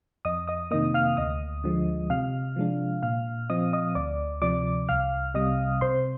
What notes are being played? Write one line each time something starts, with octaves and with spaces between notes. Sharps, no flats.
F2 D#5 D#6
D#5 D#6
C3 D#3 A#3 D#5 D#6
F5 F6
D2 D#5 D#6
D3 F3 G#3
C3 F5 F6
F3 G#3 D4
A#2 F5 F6
F3 C4 D#5 D#6
D#5 D#6
D2 D5 D6
C3 F3 D5 D6
C2 F5 F6
C3 G3 D#5 D#6
C3 C5 C6